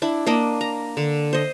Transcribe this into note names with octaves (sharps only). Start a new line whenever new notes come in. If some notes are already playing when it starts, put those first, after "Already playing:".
D4 E4
A#3 D4 D#5
A#5
D3
C5 D#5